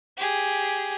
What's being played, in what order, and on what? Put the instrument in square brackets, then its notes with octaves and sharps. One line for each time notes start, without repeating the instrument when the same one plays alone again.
[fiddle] G4 G#4